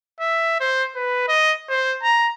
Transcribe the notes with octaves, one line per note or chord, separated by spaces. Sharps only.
E5
C5
B4
D#5
C5
A#5